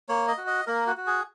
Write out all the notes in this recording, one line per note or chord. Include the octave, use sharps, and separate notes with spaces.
A#3 C#5
D#5
F#4
D#5
A#3 A#4
F#4
F#4
G#4